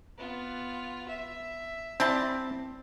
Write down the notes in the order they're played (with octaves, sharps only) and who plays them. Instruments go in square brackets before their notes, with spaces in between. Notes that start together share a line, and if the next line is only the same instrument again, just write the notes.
[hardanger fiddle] B3 F4
E5
[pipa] G3 E4 A5 [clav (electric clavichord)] C4